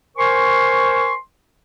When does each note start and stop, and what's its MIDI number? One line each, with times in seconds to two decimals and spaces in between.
0.17 1.13 70
0.17 1.13 72
0.17 1.13 80
0.17 1.13 84
0.17 1.13 85